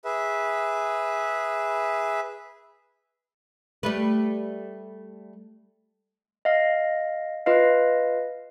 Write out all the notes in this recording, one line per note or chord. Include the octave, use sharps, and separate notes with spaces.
G#4 B4 E5
G3 A3 B4
D#5 F5
F4 B4 D#5 F5